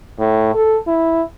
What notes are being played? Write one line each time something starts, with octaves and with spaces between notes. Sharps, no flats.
A2
A4
E4